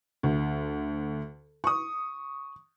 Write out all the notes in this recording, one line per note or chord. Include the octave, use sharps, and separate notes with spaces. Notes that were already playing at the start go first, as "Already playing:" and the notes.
D2
C#6 D#6